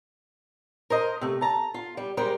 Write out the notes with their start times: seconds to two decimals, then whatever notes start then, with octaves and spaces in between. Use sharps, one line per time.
0.90 A#4 C5 D#5
1.21 C3 A3
1.41 A5 A#5
1.74 F4
1.97 G3
2.17 G3 G#3 A#4 C5